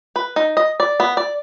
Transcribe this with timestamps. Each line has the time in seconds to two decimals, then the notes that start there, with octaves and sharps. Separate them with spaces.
0.16 B4
0.36 D#4
0.57 D#5
0.80 D5
1.00 B3
1.17 D5